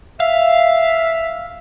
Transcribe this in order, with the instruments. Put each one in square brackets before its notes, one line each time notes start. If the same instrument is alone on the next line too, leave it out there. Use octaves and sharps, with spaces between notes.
[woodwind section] E5 [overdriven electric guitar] F5